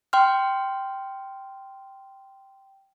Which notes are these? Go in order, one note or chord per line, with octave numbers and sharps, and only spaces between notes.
G5 C6 F6